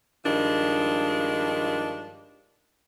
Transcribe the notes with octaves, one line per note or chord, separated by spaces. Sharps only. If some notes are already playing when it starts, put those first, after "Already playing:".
G2 D#3 F3 G#3 D4